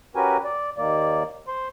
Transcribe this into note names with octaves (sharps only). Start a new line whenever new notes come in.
C#4 F#4 G4 A#4 B4 G#5
D5
D#2 D#3 A#3 D5
C5 C6